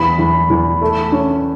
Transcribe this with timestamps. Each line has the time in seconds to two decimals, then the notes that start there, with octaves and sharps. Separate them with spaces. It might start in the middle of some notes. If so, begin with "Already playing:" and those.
Already playing: E2 B5
0.18 E2
0.50 E2
0.81 A3
1.12 C#4